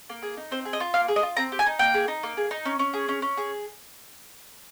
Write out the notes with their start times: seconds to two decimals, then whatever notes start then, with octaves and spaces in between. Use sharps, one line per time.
0.09 A#3
0.22 G#4
0.37 D#4
0.51 C4 C5
0.65 G#4
0.73 D#5
0.80 F4
0.94 A#3 F5
1.08 G#4
1.16 D#5
1.23 F4
1.37 C4 A#5
1.52 G4
1.59 G#5
1.66 D#4
1.79 A#3 G5
1.94 G#4
2.08 D#4
2.23 A#3
2.37 G#4
2.51 D#4
2.65 C#4
2.79 C#4
2.93 G#4
3.09 C#4
3.22 C#4
3.37 G#4